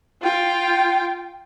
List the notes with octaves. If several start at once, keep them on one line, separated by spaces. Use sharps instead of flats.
F4 G5